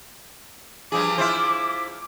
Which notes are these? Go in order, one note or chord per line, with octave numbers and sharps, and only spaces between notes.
G2 F3 G#4 D6
E4 F4 C5